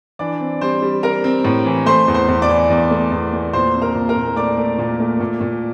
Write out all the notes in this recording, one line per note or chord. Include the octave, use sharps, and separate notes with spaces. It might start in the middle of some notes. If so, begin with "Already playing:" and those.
E3 D4 D5
C4
G3 C4 C5
G3
C4 A#4 A#5
C4
A2
E3
A3 C5 C6
E2
C5 C6
E2
D5 D6
E3
E2
A3
E2
A3
A#2 C5 C6
C4
A#4 A#5
A#2
A#4 A#5
A#2
A3 D5 D6
A3
A#2
A3
A#2
A#2